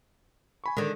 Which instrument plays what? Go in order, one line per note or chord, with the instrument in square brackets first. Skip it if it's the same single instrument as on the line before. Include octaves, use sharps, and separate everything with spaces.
[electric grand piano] G#5 B5 C#6
[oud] D3 D#3 [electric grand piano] G#3